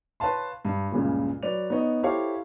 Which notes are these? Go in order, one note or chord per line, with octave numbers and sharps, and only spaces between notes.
B4 C#5 F5 A5 C6
G2
C#2 G2 A#2 C#3
F#3 B4 D5 F7
B3 D#4 C#5 D#5
E4 G4 A4 C5 C#5 F5